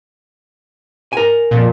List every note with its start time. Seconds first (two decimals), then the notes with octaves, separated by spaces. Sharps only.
1.13 A#4 G#5
1.51 F2 A#2